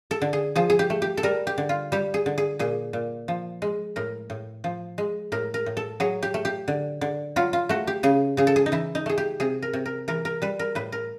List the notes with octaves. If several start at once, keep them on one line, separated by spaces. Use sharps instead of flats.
A4
D3
G#4
F3 G#4
G#4
G4
A3
G4
A4
G3 A#4
G4
D3
F4
G3 G4
G#4
D3
G#4
A#2 G#4
A#2
F3
G#3
A2 A#4
A2
F3
G#3
A2 A#4
A#4
A2
A4
F#3 G#4
G4
A3
G4
D3
D3
F#3 F4
F4
A3 F#4
G4
C#3 G#4
C#3 G#4
A4
G#4
D#4
E3 E4
D#4
A3 G#4
G4
C3 G#4
A#4
C3
A#4
E3 A#4
A#4
G3 B4
A#4
A2 B4
A#4